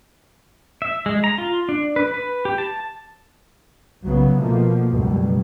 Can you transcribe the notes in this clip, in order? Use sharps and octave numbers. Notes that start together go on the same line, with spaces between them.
E5
G#3
A#5
F4
D4
B4
B4
G4
A5
C2 C#3 F#3 B3
B2 F3 A3 A#3
C#2 F#2 B2 F#3 G3 A3